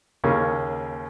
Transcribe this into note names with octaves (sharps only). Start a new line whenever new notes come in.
D#2 C#3 A#3 C#4